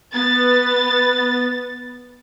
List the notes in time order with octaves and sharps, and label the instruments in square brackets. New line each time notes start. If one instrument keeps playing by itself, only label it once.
[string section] B3 A6